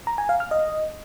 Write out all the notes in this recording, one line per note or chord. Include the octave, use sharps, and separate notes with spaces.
A#5
G#5
F5
F6
D#5